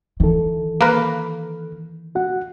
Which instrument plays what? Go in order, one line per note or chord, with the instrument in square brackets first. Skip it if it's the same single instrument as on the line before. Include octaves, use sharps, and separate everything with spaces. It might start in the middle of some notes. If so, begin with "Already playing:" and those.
[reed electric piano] D#3 A4 [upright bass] E3
[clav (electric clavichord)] A#3 A#4 B4
[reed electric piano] F#4 F#5